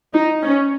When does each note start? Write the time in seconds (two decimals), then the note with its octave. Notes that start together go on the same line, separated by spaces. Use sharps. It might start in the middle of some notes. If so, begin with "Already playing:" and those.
0.13 D#4
0.42 C#4